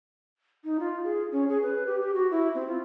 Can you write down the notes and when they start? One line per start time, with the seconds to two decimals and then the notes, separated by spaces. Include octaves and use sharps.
0.64 D#4
0.80 F4
1.04 G#4
1.32 C#4
1.49 G#4
1.62 B4
1.86 G4
2.00 G4
2.14 F#4
2.31 E4
2.55 C4
2.68 F4